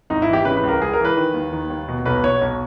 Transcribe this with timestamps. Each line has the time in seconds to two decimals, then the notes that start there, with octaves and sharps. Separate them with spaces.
0.10 G#1 D#4
0.22 E4
0.28 E3
0.33 G4
0.45 C#3 B4
0.57 B4
0.63 C#2
0.69 A#4
0.81 C#2 G#4
0.93 A#4
0.99 E3
1.05 B4
1.16 D#3
1.34 D#2
1.53 D#3
1.70 D#2
1.88 B2
2.06 B1 B4
2.24 B2 C#5
2.41 B1